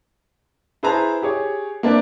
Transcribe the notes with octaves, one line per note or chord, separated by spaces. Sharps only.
E4 G#4 B4 C5 A5 A#5
G4 G#4 C#5
A#3 C4 D4 B4 D5 E5